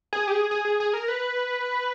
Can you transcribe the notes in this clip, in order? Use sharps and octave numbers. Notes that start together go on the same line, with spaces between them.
G#4
G4
G#4
G#4
G#4
G#4
A#4
B4